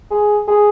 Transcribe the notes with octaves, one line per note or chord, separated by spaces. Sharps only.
G#4
G#4